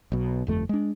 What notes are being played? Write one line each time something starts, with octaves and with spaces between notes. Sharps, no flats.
B1 B2
G1 F2 A3
G#3 D4